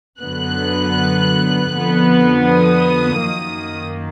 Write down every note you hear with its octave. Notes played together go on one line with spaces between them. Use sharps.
F#2 D3 F#3 B3 F#6
F2 D3 F3 B3
D#6
F#2 D#3 A#3